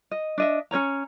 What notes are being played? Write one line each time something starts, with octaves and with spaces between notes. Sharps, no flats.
D#5
D4 D#5 E5
C#4 B4 C#5 A#5